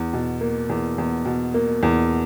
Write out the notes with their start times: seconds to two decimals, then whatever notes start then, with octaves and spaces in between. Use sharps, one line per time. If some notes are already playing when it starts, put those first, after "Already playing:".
Already playing: E2
0.13 B2
0.41 A#3
0.69 E2
0.98 E2
1.25 B2
1.54 A#3
1.83 E2